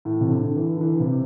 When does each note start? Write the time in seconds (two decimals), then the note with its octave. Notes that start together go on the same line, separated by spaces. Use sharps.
0.05 A2
0.21 C3
0.30 D3
0.55 E3
0.77 D3
0.81 E3
1.00 C3